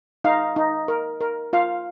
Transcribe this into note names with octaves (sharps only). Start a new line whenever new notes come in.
D#4 F5
D#4
A#4
A#4
F4 F5